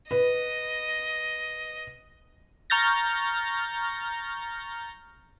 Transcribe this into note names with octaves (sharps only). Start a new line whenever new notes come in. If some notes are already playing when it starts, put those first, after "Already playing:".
B4 D#5
A#5 C#6 F6 G6 A6 A#6